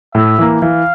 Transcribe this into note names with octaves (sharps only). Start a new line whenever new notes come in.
A2 E5
E3 A#3
E3 F5